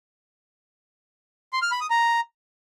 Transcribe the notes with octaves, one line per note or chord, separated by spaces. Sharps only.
C6
F6
B5
D#6
A#5